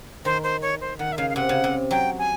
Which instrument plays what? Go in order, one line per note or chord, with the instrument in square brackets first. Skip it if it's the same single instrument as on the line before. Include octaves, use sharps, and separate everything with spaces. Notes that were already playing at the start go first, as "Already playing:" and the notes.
[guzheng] D#3 [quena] C5
[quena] C5
C#5
C5
[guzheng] D#3 [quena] F#5
[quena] E5
[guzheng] C#3 [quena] F5
[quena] F5
[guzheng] C3 [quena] F#5
[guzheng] C#3
C3
[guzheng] F#3 [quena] G5
[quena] G#5